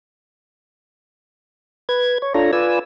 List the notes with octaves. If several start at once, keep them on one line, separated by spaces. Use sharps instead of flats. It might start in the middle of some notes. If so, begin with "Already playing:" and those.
B4 G#6
C#5
D4 F4 A4 C#5 A#5
F4 B4 D5 G#5 E6